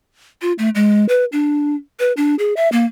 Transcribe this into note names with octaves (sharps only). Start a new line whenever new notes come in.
F4
A3
G#3
B4
D4
B4
D4
G#4
E5
A#3